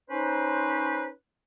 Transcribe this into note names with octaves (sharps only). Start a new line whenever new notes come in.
C#4 D#4 B4 C5